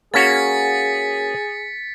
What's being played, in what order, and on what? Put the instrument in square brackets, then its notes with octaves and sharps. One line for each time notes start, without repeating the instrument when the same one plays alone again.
[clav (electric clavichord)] A#3 C#4 F#4 [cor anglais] G#4 [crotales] A6 B6 C#7